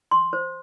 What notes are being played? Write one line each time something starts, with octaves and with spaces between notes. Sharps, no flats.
C6
C5